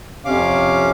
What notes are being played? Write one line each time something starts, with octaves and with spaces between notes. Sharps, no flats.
F2 C3 C#4 F5 D6